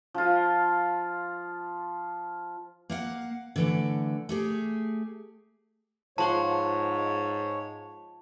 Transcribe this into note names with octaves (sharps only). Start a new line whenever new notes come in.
F3 F4
A#3 F5 F#5
D3 E3 A3
A3 G4 G#4
G#2 F3 C#5 F#5 A5 C6